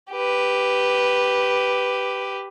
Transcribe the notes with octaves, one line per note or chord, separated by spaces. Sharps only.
G4 B4